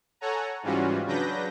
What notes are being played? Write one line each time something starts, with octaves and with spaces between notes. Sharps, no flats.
A4 C#5 F#5 G#5 A#5
G#2 E3 G3 C#4 F4 F#4
C#3 F#3 D4 B4 G6 A#6